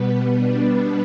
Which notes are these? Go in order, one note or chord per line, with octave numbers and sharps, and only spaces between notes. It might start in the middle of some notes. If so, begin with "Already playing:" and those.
Already playing: B2 G3 B3 B4
D4